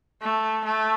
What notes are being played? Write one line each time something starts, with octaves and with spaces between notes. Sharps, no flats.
A3
A3